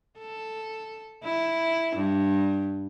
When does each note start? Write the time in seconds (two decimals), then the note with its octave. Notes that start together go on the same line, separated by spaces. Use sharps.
0.19 A4
1.24 E4
1.96 G2